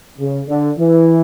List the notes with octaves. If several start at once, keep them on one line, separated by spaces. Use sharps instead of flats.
C#3
D3
E3